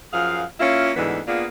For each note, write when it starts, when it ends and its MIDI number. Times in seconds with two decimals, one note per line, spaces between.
0.13 0.43 42
0.13 0.43 53
0.13 0.43 68
0.13 0.43 77
0.60 0.91 58
0.60 0.91 61
0.60 0.91 64
0.60 0.91 65
0.96 1.20 38
0.96 1.20 44
0.96 1.20 50
0.96 1.20 52
0.96 1.20 59
1.27 1.45 58
1.27 1.45 59
1.27 1.45 62
1.27 1.45 65
1.27 1.45 68